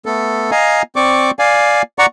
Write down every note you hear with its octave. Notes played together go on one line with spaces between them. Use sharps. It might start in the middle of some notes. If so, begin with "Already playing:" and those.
A3 B3 A4
D#5 F5 G#5 A#5
C4 D5 C#6 D6
D5 F5 G#5
D5 F#5 A#5 C#6